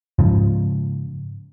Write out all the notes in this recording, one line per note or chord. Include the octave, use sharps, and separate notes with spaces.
G#2 C#3 F3